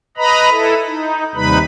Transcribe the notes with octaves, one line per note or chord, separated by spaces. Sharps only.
B4 D#5 A#5 B5
E4 A4
D#4
D#2 C3 G3 D#4 B4 B5